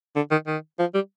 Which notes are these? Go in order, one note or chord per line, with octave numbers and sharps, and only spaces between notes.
D3
D#3
D#3
F3
G3